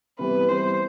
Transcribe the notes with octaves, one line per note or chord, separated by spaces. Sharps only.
C3 E3 G3 B3 B4
C3 E3 G3 B3 C5